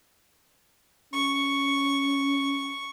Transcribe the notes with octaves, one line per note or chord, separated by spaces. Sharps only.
C#4 C#6